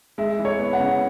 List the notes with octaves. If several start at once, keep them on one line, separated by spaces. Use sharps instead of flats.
G#3 E5
E3
C#5
B3
F#5
C#3